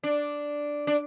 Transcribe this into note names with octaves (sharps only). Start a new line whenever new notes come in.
D4
D4